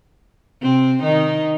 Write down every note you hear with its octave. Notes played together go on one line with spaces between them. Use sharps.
C3 C4
D#3 D#4